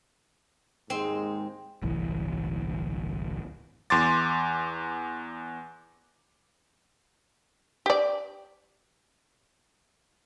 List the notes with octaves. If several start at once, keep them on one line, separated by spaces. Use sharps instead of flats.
D#2 G#2 G#3 C4
D1 G1 C2 E3
E2 C6 D6 A6
G4 D5